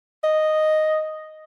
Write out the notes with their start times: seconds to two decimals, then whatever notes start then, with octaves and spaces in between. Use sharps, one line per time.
0.24 D#5